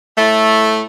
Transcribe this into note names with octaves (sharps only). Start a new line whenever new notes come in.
A2 A3